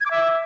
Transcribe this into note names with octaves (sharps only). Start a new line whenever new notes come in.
G#6
D6
E5